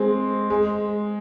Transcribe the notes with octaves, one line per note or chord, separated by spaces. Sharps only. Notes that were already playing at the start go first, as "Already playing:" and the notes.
Already playing: G#3 C4
G#3